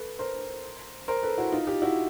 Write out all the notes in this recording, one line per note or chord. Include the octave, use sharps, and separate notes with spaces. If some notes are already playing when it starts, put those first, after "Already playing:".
Already playing: A4 B4
A#4 C5
A#4 C5
A4 B4
E4 F#4
D#4 F4
F4 G4
E4 F#4